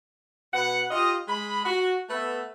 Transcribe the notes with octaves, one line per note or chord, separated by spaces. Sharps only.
B2 B4 F#5
F4 G4 D#5
G#3 B5
F#4
A3 B3 A4 B4 E5